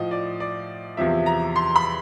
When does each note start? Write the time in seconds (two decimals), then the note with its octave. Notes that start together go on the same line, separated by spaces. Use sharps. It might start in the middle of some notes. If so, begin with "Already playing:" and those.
Already playing: A2 F3 D#5
0.11 D5
0.40 D5
0.97 E2 C3 F3 E5
1.26 A#5
1.56 C6
1.76 B5